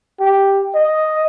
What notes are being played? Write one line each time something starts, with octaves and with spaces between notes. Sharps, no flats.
G4
D#5